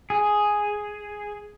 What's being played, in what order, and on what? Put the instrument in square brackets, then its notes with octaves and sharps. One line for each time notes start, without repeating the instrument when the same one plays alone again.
[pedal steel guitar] G#4